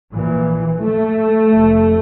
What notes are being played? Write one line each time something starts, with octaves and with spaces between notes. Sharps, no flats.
A#1 A#2 E3
A3
F1 F2 C3